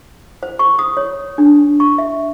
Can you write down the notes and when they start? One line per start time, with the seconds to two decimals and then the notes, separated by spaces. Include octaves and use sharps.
0.43 C5
0.59 C#6
0.79 D#6
0.97 C#5
1.38 D4
1.80 C#6
1.98 E5